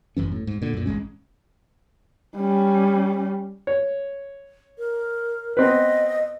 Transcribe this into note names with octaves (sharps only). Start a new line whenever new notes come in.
G1 F#2 E3 C#4
A2
G#2
A#2 D3
F#2 A#2
G#1 F#2 G#3 C#4
G3 C#4
C#5
A#4
B3 C4 B4 D#5